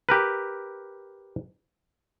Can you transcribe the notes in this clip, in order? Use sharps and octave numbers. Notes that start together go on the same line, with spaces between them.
G4 A#4 B4